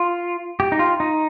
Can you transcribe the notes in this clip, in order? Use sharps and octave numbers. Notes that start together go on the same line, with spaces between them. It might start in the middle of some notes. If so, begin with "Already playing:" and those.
Already playing: F4
G4
D#4
F4
D#4